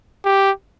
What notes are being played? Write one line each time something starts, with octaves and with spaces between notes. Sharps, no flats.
G4